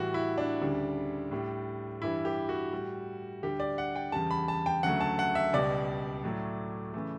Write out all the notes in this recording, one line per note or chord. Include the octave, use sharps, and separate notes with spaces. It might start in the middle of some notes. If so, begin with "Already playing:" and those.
Already playing: A2 E3 G3 F#4
E4
D4
D2 C#3 G3
A2 G3
G2 E3 G3 E4
G4
F#4
A2 G3
D2 D3 G3 G4
D5
F#5
G5
E2 C#3 G3 A5
B5
A5
G5
D2 C#3 F#3 A3 F#5
A5
F#5
E5
C#2 B2 G3 D5
A2 F#3 A3
C#3 E3 A3